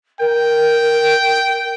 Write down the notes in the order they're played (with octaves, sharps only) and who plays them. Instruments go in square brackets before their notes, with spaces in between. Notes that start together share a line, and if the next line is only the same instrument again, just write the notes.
[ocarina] A#4 [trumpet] G5